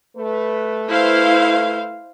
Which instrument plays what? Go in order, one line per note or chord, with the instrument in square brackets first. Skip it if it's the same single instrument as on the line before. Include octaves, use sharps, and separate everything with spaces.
[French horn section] A3 B4
[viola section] E4 C5 F5